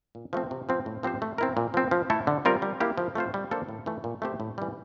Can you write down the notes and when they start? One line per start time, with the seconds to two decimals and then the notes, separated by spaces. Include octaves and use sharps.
0.15 A#2
0.33 F3 A3 C4
0.51 C3
0.69 F3 C4
0.86 A2
1.03 F3 C4 G4 C5
1.22 A3
1.38 C4 E4 A#4
1.57 A#2
1.74 F3 C4
1.91 F3
2.10 A3 E4 A4
2.27 D3
2.45 G3 C4 F4 A#4
2.62 G3
2.80 A#3 E4 G4
2.97 F3
3.15 A3 C4 F4 C5
3.34 G3
3.51 A#3 D4 A4 C5
3.69 A2
3.86 E3 A3
4.04 A#2
4.22 A3 C4 G4 C5
4.40 A2
4.58 E3 G3